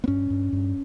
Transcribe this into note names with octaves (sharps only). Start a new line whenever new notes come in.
B3
G2 C#4
G2
G2